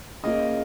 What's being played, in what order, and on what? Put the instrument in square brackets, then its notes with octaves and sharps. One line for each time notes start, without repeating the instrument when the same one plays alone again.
[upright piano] C#3 A#3 F4 D#5